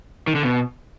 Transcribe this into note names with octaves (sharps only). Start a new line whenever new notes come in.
D#3
D3
B2